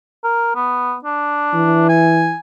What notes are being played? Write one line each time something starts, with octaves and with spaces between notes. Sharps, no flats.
A#4
B3
D4
E3
G#5